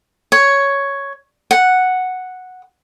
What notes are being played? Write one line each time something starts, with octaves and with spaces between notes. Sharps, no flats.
C#5
F#5